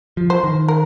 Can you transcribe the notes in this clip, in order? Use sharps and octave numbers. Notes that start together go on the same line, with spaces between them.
F3
C5
D#3
A#4